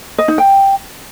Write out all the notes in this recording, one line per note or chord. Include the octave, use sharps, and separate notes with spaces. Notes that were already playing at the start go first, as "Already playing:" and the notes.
D#5
D#4
G5